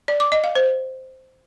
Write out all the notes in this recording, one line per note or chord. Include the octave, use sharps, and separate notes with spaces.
D5
D6
D#5
F5
C5